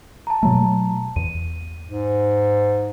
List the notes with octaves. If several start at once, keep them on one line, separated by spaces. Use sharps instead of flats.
A5 A#5
B2 F#3 A3
E2 D#7
G#2